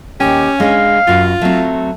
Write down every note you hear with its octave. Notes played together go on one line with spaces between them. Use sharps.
D#2 C#4 G4 G5
G#3 D4 F5
F#2 F4 F#4
F#3 A3 C4